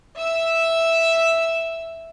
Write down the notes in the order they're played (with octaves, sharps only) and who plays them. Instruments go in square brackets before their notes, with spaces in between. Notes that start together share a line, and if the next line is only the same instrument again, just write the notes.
[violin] E5 E6